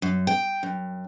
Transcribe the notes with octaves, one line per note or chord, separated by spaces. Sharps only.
F#2
G5
F#2